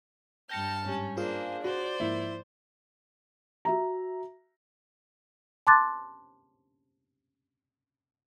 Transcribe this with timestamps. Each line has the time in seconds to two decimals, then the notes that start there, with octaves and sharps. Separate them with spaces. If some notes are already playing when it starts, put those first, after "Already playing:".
0.49 G2 G5 A5 F6 G6 A#6 C#7
0.85 G#2 G3 C#4
1.17 A#3 D4 F4 G#4 C5 F5
1.64 F#4 C5 D5
2.00 G#2 F3 A#3 E4
3.65 F#4 E5 A#5
5.67 A5 C6 D6 F#6 A6